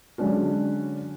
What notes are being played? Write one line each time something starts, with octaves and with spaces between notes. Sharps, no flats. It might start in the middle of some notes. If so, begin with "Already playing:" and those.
D3 F#3 G#3 C#4 D4 F#4